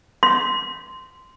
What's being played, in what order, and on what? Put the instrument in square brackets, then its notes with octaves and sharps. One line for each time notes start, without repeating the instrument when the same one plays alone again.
[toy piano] C6